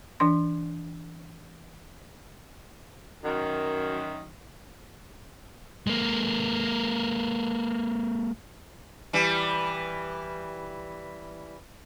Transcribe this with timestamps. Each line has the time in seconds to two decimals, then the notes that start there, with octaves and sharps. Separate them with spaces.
0.20 E3 D4 C6
3.24 F#2 D#3
5.87 G#3 A#3
9.13 E3 G3